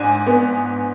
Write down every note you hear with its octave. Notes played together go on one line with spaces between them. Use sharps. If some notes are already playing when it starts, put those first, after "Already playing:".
Already playing: G#2 D4 G#5
B3